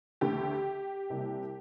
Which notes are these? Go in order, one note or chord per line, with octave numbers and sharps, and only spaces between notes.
D2 D3 A3 G4
C2 C3 G3 A#3